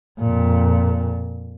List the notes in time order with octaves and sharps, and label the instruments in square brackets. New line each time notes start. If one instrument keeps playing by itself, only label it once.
[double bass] F2 A#2